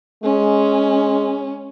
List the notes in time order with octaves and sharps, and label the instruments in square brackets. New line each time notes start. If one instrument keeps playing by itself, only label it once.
[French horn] G#3 [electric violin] C#4